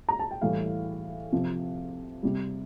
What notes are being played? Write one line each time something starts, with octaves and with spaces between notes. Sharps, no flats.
A#5
A5
G5
A2 E3 G3 F5
C3 F3
C3 G3